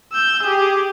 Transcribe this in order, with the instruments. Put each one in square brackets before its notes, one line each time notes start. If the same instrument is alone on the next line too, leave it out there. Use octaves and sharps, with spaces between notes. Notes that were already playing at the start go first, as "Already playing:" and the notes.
[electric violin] E6 G6
G4 G#4